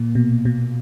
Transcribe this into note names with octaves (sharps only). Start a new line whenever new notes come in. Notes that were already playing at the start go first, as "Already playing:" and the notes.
Already playing: A#2 A#3
B2
B2